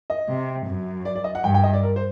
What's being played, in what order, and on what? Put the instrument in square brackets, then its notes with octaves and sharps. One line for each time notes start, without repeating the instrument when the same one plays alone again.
[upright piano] D#5
[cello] C3
F#2
[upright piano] D5
D5
D#5
F#5
[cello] G2 [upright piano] G5
[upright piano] G5
D#5
D5
A#4
C5